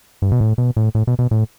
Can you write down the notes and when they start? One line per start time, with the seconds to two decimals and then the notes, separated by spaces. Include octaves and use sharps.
0.22 G2
0.32 B2
0.41 A2
0.58 B2
0.77 A2
0.95 A2
1.07 B2
1.19 B2
1.31 A2